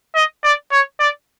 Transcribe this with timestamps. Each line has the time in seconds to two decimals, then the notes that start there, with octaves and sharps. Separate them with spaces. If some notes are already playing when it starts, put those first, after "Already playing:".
0.15 D#5
0.44 D5
0.72 C#5
1.00 D5